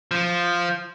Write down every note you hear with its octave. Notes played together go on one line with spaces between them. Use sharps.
F3